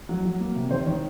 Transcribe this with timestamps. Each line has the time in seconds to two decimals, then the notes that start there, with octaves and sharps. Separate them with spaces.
0.09 F#3
0.25 F#3
0.40 A#3
0.56 C3
0.71 D#3 C5
0.86 D#3 C#5